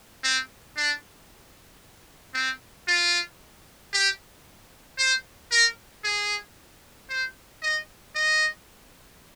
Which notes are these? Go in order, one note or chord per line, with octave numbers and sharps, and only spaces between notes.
C4
D4
C4
F4
G4
C5
A#4
G#4
C5
D#5
D#5